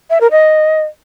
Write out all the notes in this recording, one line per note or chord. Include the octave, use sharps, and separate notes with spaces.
E5
A#4
D#5